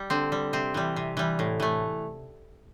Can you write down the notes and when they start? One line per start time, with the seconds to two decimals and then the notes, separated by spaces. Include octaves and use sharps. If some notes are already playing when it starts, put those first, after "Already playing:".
Already playing: G3
0.10 D3 C4
0.32 G3
0.53 C3 C4
0.74 E3 G3
0.96 C3
1.17 E3 G3
1.39 A2
1.60 E3 A3